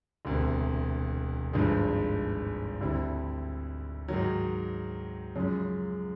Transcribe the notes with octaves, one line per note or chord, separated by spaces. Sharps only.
E1 D2 C3
G#1 G2 D3 F3 G#3
D2 D3 G3 C4 E4
G#2 D#3 F#3
F#2 C#3 F3 G#3 C#4